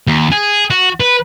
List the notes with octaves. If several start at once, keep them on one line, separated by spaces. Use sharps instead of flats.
D#2
G#4
F#4
B4